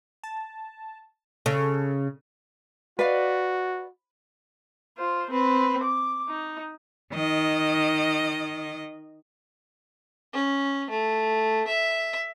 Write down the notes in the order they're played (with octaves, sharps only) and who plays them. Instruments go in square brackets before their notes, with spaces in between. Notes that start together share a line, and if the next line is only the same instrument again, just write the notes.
[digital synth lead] A5
[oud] C#3 [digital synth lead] A4
[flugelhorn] F#4 [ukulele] B4 [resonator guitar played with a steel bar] D5 D#5 F5
[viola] F4 C5
C4 B4
D6
D#4
[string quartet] D#3 D#5
[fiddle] C#4
A3
E5